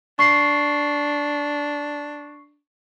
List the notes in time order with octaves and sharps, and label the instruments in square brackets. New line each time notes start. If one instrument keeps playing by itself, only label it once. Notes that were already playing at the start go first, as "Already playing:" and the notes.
[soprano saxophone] D4 [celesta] C#6 C7